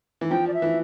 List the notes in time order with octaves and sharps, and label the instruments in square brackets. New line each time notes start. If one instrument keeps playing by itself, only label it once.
[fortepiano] E3
[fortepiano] F3 [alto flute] G5
[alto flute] D5
E5
[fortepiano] E3